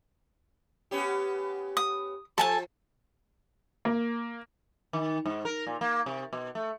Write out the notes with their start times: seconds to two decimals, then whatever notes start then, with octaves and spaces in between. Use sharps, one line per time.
0.91 B3 C#4 G4
1.77 D#6
2.38 F3 A4 G#5 A5
3.85 A#3
4.93 D#3
5.26 G#2
5.45 A#4
5.67 A#2
5.81 A#3
6.06 C3
6.33 B2
6.55 A3